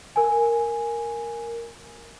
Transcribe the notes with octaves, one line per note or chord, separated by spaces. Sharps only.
A#4 G#5